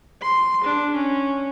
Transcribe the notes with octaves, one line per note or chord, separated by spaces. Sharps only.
C6
D4
C#4